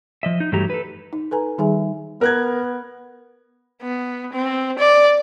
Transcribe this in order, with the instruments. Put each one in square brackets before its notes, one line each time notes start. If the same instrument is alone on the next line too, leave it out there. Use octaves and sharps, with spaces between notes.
[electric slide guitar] F3 D#5 E5
D#4
G2 E3 F#3 A3 G4 A#5
A4 B4
[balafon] D#4
A4 B4 G#5 A#5
D#3 G3 D#4 G#4 E5 G#5
[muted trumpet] B3 [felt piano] A#4 F#6 G#6
[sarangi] B3
C4
D5